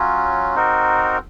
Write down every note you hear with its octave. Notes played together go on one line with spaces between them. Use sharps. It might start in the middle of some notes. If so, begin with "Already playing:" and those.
Already playing: F#3 C#4 F4
C4 D#4 F#4 A#4